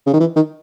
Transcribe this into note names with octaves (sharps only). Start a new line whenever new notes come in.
C#3
D#3
E3
D#3